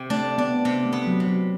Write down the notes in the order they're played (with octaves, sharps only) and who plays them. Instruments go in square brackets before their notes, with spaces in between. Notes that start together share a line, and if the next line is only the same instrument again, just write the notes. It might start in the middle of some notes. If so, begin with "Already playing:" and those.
Already playing: [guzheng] C3
[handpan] A3 [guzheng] D4
[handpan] B3 [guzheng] D4
[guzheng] C3 [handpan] B3
[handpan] A3
[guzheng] B3
[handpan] F#3
[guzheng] C3
[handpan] F#3